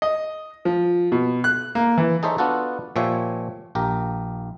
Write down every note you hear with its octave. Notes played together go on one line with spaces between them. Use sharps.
D#5
F3
B2
F#6
A#3
E3
D#4 G#4 A4 C5 C#5 E5
B3 D4 F4 F#4 A4
A#2 F3 G4 C#5 E5 G#5
A#1 G4 A#4